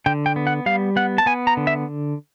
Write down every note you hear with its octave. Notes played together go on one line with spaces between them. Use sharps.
D3 G5
G5
B3
F#5
G3 F5
B3 F#5
A5
B3 G#5
A#5
D3
E5